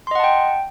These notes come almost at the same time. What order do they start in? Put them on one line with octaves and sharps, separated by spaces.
C6 D#5 F#5 A5 G5